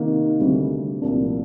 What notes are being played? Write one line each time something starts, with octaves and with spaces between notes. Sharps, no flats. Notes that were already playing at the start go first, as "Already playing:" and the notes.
Already playing: C3 D#3 A#3
D2 C3 G3
C2 A#2 F3 A#3 D4